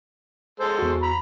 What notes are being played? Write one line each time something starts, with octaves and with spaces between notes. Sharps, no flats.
G#3 A4 C5
E2 F#4
A#5 B5